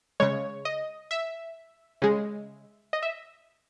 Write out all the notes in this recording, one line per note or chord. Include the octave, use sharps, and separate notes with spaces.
C#3 G#3 C#5
D#5
E5
C#3 G#3
D#5
E5